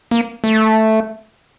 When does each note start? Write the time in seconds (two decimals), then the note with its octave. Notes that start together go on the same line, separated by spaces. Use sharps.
0.11 A#3
0.44 A3